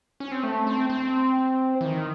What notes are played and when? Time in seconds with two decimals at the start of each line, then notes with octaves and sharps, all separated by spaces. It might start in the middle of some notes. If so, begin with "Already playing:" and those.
0.20 C#4
0.32 C4
0.43 A3
0.67 C4
0.90 C4
1.81 E3
1.85 D#3